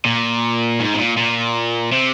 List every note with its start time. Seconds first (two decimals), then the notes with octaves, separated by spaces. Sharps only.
0.05 A#2
0.80 G#2
0.94 C3
0.98 A#2
1.17 A#2
1.92 C3